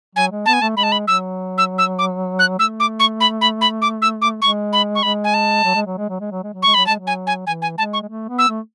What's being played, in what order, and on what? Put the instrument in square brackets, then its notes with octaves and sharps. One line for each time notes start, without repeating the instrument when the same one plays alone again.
[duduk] F#3 [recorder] G#5
[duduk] G#3
[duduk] B3 [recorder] A5
[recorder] G#5
[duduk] A3 [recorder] A5
[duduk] G#3 [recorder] B5
[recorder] A5
B5
[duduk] F#3 [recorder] E6
[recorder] E6
E6
D6
F#6
[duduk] A3 [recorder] E6
[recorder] D6
C#6
B5
B5
B5
D6
E6
D6
[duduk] G#3 [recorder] C#6
[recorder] B5
C#6
[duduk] G#3 [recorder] B5
[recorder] G#5
A5
[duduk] F#3
G#3
F#3
G#3
F#3
G#3
F#3
G#3
F#3
[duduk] G#3 [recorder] C#6
[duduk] F#3 [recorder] B5
[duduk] G#3 [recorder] A5
[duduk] F#3
[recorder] G#5
G#5
[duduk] E3 [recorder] G#5
[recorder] G#5
[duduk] G#3 [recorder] A5
[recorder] C#6
[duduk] G#3
A3
B3
[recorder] E6
[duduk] A3